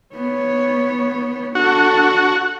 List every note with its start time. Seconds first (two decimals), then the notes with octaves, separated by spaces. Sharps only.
0.15 B3 C#5
1.55 D4 F#4 A4